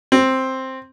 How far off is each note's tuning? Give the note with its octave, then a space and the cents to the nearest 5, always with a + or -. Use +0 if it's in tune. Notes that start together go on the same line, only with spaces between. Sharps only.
C4 +5